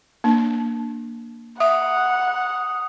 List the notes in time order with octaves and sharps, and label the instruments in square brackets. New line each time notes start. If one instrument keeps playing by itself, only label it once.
[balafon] A#3 D4
[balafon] E5 [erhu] F#5 [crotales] D#6